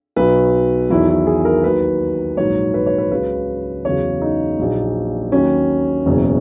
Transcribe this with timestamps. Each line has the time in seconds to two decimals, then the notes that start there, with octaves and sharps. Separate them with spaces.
0.16 B1 B2 F#3 B4
0.90 E2 D#3 F#3 E4
1.08 E4
1.27 G#4
1.45 A#4
1.64 D#2 D#3 F#3 B4
2.37 A#1 G#2 F#3 C#5
2.74 B4
2.86 C#5
2.98 B4
3.11 C#2 C#3 F#3 B4
3.85 E2 C#3 F#3 C#5
4.22 D#4
4.59 A#1 A#2 F#3
5.32 D#2 D#3 F#3 C#4
6.06 F#1 E2 B2 F#3